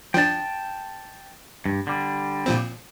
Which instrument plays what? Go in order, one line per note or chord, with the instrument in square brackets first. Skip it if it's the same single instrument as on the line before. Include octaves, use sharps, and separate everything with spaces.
[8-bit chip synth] F3 D4 [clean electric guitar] G5 A5
[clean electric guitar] G2
D3 G3
[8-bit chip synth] A#2 F3 C4